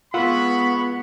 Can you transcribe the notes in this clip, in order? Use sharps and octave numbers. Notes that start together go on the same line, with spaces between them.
G#3 B3 F4 F#5 B5 C#6 E6